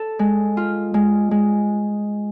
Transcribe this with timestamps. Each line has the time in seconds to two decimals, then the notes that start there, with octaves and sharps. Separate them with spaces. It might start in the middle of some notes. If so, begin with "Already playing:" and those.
Already playing: A4
0.19 G#3
0.57 F4
0.94 G#3
1.31 G#3